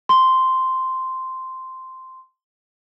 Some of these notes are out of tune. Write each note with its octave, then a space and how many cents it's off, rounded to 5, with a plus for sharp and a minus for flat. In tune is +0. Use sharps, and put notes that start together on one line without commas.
C6 -5